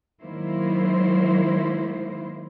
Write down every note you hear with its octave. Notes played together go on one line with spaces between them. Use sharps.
D#3 F#3 G#3 A#3 E4 C5